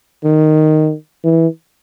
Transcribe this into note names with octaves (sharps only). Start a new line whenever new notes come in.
D#3
E3